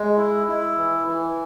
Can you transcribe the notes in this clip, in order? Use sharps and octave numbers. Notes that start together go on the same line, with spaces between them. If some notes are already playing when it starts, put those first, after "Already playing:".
Already playing: G#3
E4
E4
E3
E3